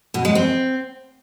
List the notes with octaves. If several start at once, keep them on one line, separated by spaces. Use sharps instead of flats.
B2
G#3
C4